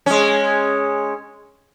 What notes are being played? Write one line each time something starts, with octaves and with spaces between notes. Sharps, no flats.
G#3 C#4